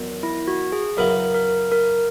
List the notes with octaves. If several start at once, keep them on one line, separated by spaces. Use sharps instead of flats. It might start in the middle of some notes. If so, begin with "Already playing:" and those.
Already playing: E2 D#3 F#3
E4
F#4
G#4
F#2 C#3 F#3 B3 E4 A#4
A#4
A#4